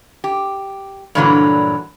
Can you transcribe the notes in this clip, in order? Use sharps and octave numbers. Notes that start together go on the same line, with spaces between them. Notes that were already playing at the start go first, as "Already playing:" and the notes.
G4
G2 A#2 D3 E3 F#3